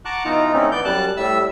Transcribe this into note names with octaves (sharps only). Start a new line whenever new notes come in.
F#5 A5 A#5 C#6 D6 F#6
B2 E3 D#4 F4 A#5
D3 A3 C4 C#4 D#4
E3 B3 D5 G6
F#2 G3 A5 F#6
A2 G3 E5 E6